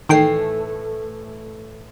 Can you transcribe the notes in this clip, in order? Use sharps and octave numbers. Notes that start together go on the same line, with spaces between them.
A2 D#3 E3 A3 G5 C7